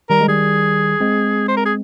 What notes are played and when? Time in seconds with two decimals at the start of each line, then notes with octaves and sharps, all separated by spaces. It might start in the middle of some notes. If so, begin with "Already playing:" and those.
0.10 D#3 G3 A#4
0.21 G#3
0.28 D#3 G3 G#4
1.00 G#3 C4
1.48 C5
1.56 A#4
1.65 G#4